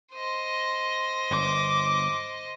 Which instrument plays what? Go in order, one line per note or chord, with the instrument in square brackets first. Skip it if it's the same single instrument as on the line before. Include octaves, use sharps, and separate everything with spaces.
[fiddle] C5 D#5
[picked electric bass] G1 [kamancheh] D6